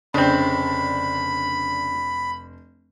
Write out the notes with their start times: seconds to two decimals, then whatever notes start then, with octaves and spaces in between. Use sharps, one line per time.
0.14 F1 C#3 C4 D4 B5